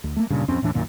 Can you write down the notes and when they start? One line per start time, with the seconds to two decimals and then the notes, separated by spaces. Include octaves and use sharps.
0.04 D2
0.16 A3 A#3
0.30 D1 G2 A#2 C#3
0.48 D1 F2 C4 C#4
0.62 D#2 A2 E3 D4
0.74 B1 F#2 A#2 D#3